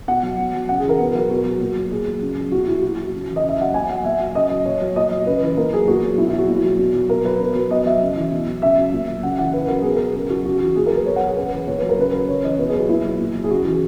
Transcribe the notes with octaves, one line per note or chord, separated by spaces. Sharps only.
B2 F#5
F#3
B2
F#3
C#3 F#5
G#4
E3 A#4
B2 B4
F#3 A#4
B2 F#4
F#3
A#2
F#3
A#2 G#4
F#3
C#3
F#3
B2 F#4
F#3 E4
A#2 F#4
F#3
C#3
E3
D#5
C#3 E5
F#3 F#5
A#2 G#5
F#3 F#5
A#2 E5
F#3
C#3 D#5
F#3
A#2 C#5
F#3
A#2 D#5
F#3
C#3 B4
E3
A#2 A#4
F#3 G#4
A#2 F#4
F#3
B2 E4
E4
F#3
F#4
A#2
F#3
B2
F#3
B2 A#4
F#3 B4
B2
F#3
B2 D#5
F#3 E5
C#3
E3
B2
F#3
C#3 E5
F#3
A#2
F#3
C#3 F#5
E3 F#5
C#3 B4
F#3 A#4
B2 G#4
F#3 A#4
C#3 G#4
F#3 F#4
C#3 F#4
E3 F#4
A#2 G#4
A#4
F#3
B4
B2 C#5
F#5
F#3
G#4
C#3 B4
E3
A#2 C#5
F#3 B4
A#4
C#3 B4
F#3
C#3 C#5
E3 D#5
B2 B4
G#4
F#3
F#4
A#2 E4
F#3
A#2
F#3
G#4
C#3 F#4
E3